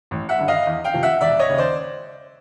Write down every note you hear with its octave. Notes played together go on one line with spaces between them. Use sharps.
A1
E5 F#5
G2 D3
D#5 F5
E2
F5 G5
C3 F3
E5 F#5
E1 D5 E5
C#5 D#5
D#2 C#3
C5 D5